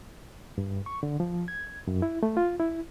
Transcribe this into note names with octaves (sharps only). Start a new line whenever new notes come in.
G2
C#6
D3
F3
G#6
F#2
E4
A3
F4
E4